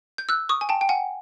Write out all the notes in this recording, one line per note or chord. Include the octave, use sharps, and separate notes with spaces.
G6
E6 F#6
C#6 D#6
G#5
G5 A5
G5
F#5 G#5